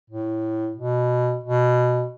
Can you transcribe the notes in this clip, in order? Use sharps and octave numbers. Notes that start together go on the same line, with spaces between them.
A2
B2
B2